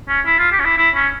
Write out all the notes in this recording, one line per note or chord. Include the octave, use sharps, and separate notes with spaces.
C#4
E4
F4
G4
C#4
E4
E4
C#4